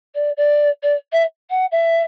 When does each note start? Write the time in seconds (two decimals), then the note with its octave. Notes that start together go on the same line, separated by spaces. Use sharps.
0.15 D5
0.37 D5
0.82 D5
1.12 E5
1.50 F#5
1.71 E5